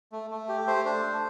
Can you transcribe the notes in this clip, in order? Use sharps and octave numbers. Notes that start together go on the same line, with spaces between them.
A3
A3
G4
A3 C5
D4 C5
A3